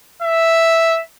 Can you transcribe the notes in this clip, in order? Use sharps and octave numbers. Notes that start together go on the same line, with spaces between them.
E5